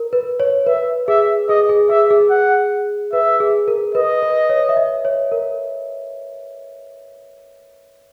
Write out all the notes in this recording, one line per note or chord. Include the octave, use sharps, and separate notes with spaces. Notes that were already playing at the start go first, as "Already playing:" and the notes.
Already playing: A#4
B4
C#5
B4 E5
G#4 E5
G#4 D#5
G#4
G#4 E5
G#4
F#5
B4 E5
G#4
A#4
B4 D#5
B4
C#5
E5
D#5
C#5
A#4